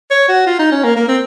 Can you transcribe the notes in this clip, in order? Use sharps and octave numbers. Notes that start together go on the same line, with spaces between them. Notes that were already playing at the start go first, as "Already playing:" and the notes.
C#5
F#4
F4
D#4
C#4
A#3
A#3
C4